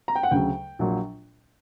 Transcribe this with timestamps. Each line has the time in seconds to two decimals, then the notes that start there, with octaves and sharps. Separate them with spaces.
0.08 A#5
0.15 G5
0.23 F#5
0.31 D2 C#3 F#3 G5
0.79 A#1 A#2 F#3